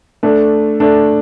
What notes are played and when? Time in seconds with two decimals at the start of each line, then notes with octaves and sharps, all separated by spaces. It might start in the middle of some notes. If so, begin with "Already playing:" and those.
0.23 A3 D4 A4
0.80 A3 D4 A4